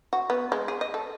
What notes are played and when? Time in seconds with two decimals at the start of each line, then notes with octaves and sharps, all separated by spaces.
0.13 F#4
0.30 B3
0.52 G#3
0.68 G#4
0.81 D#5
0.94 A4